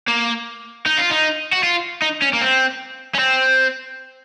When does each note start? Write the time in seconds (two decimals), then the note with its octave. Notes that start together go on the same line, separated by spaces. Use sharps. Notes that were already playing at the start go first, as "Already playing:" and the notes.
0.08 A#3
0.86 D#4
0.98 F4
1.10 D#4
1.53 F#4
1.63 F4
2.02 D#4
2.22 C#4
2.33 A#3
2.41 C4
3.15 C#4
3.19 C4